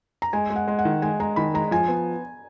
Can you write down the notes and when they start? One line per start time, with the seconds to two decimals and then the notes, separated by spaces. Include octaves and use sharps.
0.22 A#5
0.33 G#3 G#5
0.50 G#3
0.56 F#5
0.68 G#3
0.79 F#5
0.85 D#3
1.02 G#3 G#5
1.20 G#3 A#5
1.36 D#3 B5
1.54 G#3 A#5
1.71 F3 G#5
1.88 B3